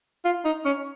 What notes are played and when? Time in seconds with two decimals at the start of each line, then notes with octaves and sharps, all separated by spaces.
0.25 F4
0.45 D#4
0.65 C#4